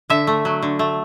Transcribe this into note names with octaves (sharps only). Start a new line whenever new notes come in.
D3 E5
A3
F#3
D3
A3